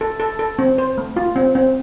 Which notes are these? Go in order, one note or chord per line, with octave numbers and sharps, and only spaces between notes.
A4
A4
A4
C4
C5
A3
F4
C4
C4